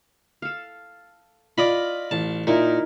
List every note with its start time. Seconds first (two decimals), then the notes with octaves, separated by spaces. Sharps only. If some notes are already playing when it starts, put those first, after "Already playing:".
0.42 A4 F5
1.58 F4 D5 D#5 B5
2.11 A1 A5
2.47 A#2 D#4 E4 A#4